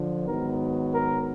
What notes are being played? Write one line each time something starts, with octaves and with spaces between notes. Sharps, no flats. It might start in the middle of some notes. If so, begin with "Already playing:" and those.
Already playing: D3 F3
G#2 D#3 F#3 B3 A#4
A#4